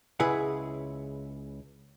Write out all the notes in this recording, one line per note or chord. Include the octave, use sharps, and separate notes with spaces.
C#2 C#3 E4 G#4 B4 F#5